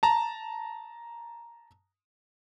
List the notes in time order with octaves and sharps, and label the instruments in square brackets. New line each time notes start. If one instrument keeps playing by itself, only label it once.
[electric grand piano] A5 A#5